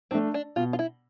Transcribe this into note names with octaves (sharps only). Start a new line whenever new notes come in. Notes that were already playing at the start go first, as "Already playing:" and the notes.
A3 C4 D4
D4
B2 F4
F4
E4